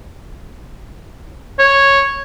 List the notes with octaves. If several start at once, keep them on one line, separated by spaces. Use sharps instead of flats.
C#5